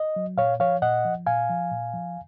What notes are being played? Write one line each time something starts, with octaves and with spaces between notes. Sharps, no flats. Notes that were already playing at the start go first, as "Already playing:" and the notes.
Already playing: D#5
F#3
A#2 C#5 F5
F3 C#5 F5
A#2 D#5 F#5
F3
A#2 F5 G#5
F3
A#2
F3